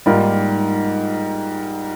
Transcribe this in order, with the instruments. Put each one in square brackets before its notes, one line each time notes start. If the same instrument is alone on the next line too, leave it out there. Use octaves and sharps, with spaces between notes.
[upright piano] G#2 G3 A#3 F4 A#4